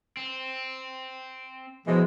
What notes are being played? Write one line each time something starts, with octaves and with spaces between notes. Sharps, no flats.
C4
B2 E3 F3 G#3